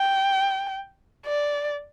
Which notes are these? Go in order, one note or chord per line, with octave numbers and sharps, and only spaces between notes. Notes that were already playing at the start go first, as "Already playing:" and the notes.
Already playing: G5
D5